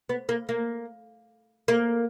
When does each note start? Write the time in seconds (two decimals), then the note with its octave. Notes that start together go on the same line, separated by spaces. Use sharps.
0.09 B3
0.29 A#3
0.49 A#3
1.68 A#3